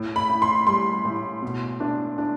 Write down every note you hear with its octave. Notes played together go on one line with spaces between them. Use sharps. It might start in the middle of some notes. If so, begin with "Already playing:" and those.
Already playing: A2
B5
A2
C6
G3 C6
A2
B2
D4
D4